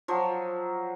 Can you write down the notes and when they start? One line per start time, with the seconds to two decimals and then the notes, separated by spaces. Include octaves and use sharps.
0.08 F3 F#3